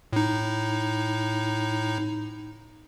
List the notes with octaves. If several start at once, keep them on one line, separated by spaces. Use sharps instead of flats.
A2 D#4